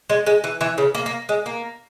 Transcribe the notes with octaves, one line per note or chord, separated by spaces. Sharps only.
G#3
G#3
E3
E3
C#3
A#3
A#3
G#3
A#3